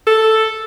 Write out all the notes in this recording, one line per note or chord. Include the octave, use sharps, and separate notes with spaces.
A4